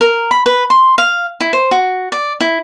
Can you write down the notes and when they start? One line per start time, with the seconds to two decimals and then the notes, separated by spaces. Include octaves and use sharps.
0.01 A#4
0.31 B5
0.46 B4
0.70 C6
0.98 F5
1.40 E4
1.53 C5
1.71 F#4
2.12 D5
2.41 E4